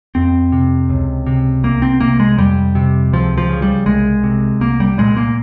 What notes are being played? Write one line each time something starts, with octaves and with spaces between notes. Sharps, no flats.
F2 C4
C3
C#2
C3
C2 A#3
C4
C3 A#3
G#3
F2 G3
C3
C#2 F3
F3
C#3
G3
C2 G#3
C3
C2 A#3
G3
A#2 G#3
A#3